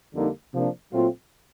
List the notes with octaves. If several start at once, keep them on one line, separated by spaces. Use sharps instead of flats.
F2 D3 G3 A#3 D#4
C3 F3 A#3 D4
A#2 F#3 A3 C4 F4